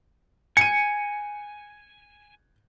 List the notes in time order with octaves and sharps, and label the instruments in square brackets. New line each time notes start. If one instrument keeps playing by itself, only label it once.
[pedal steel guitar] G#5 [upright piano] C#7 D#7